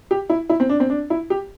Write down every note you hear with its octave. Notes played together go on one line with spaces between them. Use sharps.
G4
E4
E4
C4
D4
C4
D4
E4
G4